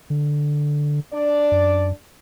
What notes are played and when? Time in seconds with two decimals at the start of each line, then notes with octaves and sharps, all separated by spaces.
0.10 D3
1.13 D4 D5
1.52 F#2